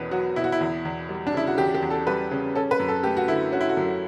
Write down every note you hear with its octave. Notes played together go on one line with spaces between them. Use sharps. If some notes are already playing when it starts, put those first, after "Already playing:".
Already playing: E2 B2 C#4 B4
F#3 F#4
B2 E4
F#4
E4
E2
E2
G3
D4
C#3 E4
F#4
E2 G4
G4
E2
A4
G3 B4
C#3
C#4 A4
B4
F#2
A4
A3 G4
F#4
D3 E4
C#4 F#4
E4
F#4
F#2